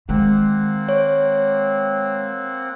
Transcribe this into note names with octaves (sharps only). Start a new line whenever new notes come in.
D#3 G#3 A#3 C4 F#5
C#5